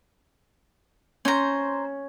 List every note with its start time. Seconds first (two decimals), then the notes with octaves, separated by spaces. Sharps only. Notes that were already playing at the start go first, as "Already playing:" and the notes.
1.25 C#4 C5 A#5